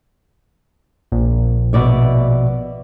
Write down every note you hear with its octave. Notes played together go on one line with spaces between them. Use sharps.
A#1
B2 D5 E5